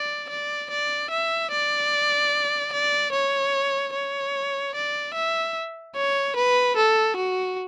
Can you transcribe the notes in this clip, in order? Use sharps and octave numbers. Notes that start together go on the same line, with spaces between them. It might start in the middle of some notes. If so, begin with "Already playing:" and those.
Already playing: D5
D5
D5
E5
D5
D5
C#5
C#5
D5
E5
C#5
B4
A4
F#4